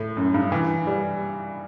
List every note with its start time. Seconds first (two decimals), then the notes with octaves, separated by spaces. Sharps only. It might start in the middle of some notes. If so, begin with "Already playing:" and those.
Already playing: A2
0.17 F#2
0.34 G2
0.52 E3
0.87 G3